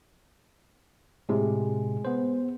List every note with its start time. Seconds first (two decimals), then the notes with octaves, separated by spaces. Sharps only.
1.29 A2 C3 G#3
2.05 B3 C5